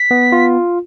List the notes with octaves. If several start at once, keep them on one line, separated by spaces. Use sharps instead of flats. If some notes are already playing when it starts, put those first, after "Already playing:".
Already playing: B6
B3
F4